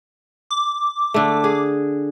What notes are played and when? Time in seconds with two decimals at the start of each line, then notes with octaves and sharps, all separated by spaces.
0.51 D6
1.14 D3 A3
1.44 G#4